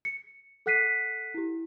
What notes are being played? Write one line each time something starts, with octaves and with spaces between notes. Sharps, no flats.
C#7
A4 F#5 F#6 B6 C7 D#7
E4 G4